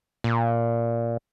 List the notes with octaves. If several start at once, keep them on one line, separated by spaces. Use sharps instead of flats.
A#2